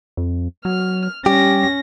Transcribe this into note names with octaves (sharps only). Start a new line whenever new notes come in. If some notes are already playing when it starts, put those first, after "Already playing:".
F2
F#3 F6
G3 C#4 G4 A#6